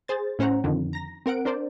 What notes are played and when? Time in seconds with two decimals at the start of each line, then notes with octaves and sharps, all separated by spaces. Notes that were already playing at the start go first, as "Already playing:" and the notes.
0.08 G#4 C5 A6
0.39 A2 C#4 C5 F#5 A#5
0.64 F2 D3 D#3
0.93 A#5 A#6
1.26 C4 A#4 F#5 D7
1.45 D4 A#4 C5 D5